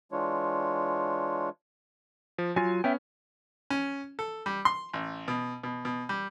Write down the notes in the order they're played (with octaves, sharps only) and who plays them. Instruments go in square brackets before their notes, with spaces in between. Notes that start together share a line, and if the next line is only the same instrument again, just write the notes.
[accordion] E3 G#3 D4 F4 C#5
[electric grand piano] F3
[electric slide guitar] F#3 F4 [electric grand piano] G#5
[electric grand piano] B3 C#4 [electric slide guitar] E5 G5
[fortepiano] C#4
A4
G3
C6
A1
B2
B2
B2
G3